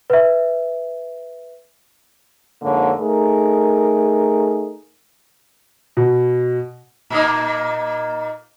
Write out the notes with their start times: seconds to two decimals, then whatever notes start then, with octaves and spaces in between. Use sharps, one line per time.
0.10 B4 E5
2.62 F2 G#2 D3 A#3 C#5
2.99 A3 D#4 G#4 A#4
5.97 B2
7.10 A#2 A#3 D#4